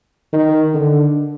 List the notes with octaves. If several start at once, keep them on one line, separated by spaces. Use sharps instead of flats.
D#3
D3